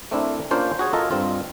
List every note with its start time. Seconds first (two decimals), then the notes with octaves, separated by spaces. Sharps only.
0.11 A3 C4 D4 E4 A#4
0.51 A#3 C#4 D4 F4 C5
0.79 F#4 G#4 C#5
0.93 F4 A4 A#4 D#5
1.11 G2 C4 F4